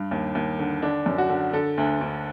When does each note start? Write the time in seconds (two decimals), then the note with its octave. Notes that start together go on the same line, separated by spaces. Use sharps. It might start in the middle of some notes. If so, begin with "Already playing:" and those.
Already playing: G2
0.11 D#2
0.35 D#2
0.59 D3
0.82 D3 D4
1.06 F#2
1.18 F#4
1.30 D3
1.53 D3 A4
1.78 D2
2.01 D2